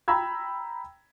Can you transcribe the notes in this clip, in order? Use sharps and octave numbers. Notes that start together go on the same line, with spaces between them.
G5 A#5 B5 E6 G#6